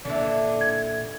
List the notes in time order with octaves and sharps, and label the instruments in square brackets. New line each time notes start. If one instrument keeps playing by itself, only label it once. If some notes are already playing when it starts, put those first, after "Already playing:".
[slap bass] A#2 [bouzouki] D3 E3 [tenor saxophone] D4
[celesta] G#6